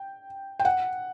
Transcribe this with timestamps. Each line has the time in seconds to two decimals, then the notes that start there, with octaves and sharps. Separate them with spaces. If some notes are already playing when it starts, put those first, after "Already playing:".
Already playing: G5
0.60 G5
0.65 F#5